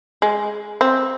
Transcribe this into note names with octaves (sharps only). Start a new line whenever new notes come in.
G#3
C4